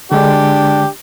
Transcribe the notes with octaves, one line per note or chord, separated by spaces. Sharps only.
D3 G#3 D4 G4